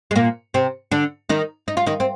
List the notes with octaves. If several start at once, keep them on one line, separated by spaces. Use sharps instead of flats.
G#3
A#2 A#3
C3 C4
D3 D4
D#3 D#4
D#4
F4
D#3 D#4
C4